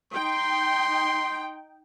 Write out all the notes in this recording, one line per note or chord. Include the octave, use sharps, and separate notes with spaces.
D#4 G5 C6